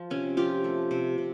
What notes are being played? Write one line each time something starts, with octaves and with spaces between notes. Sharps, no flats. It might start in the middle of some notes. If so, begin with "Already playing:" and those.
Already playing: F3
C3 C#4
F3 F4 G4
A3
C3
C3